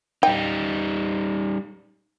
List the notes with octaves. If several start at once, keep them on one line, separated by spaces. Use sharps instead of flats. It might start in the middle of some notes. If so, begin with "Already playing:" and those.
G3 D#4 G5